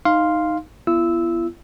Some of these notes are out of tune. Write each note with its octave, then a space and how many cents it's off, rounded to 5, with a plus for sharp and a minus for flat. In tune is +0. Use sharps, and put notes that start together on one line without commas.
D#4 +0 F5 +0 C6 +0
B3 +0 E4 +45 E6 -10